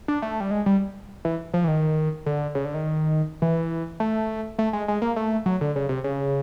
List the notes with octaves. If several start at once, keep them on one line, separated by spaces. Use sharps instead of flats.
D4
A3
G3
G#3
G3
E3
F3
E3
D#3
D3
C#3
D3
D#3
E3
A3
A3
G#3
G#3
A#3
A3
F#3
D3
C#3
C3
C#3